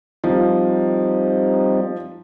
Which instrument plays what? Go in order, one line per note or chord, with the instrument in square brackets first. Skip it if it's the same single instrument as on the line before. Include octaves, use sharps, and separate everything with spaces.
[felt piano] F3 [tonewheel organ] G3 C4 D#4